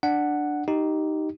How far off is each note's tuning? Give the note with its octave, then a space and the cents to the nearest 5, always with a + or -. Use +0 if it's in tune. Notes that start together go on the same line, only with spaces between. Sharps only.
D4 +5 F#5 +0
D#4 +0 G4 -15